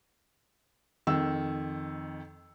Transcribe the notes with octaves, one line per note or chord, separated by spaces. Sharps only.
F2 D#3 E6